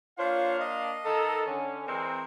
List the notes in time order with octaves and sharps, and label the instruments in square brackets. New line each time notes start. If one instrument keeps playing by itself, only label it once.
[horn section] A#3 D4 F5 [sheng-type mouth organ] F4 C5 C#5
[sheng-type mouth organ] D#5
[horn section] D#3 D#4 A4
D3 C#4
[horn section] E3 G#3 C4 [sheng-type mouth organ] A#4